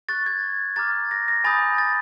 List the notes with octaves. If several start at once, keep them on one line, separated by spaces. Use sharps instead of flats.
C#6 F#6 A6
G#6
A#5 D6 F6 A6
A#6
A#6
G#5 B5 D#6 G6 A6
A6